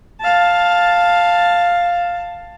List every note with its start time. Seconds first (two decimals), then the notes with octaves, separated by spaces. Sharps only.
0.21 F5 A5